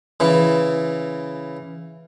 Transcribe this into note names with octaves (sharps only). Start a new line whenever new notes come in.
C#3 E3